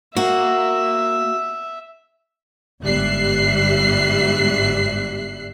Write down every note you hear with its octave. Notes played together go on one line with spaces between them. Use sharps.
A#3 F#4 A#4 E5
G1 G#2 G3 E5 F#6 C7